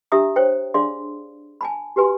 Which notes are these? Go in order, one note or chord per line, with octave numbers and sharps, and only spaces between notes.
D4 G4 E5 A#5 D#6 E6
C5 C#5 G5
D4 G#4 D5 F5 C6
G#5 A5 B5
F#4 G4 B4 G#5 C6